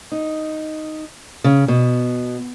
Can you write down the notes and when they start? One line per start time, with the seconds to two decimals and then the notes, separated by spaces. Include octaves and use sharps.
0.12 D#4
1.44 C#3
1.68 B2